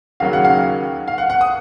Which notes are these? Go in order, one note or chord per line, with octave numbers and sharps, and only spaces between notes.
D#2 C#3 F#3 C#4 F5
F#5
F5
F5
F#5
F#5
D#6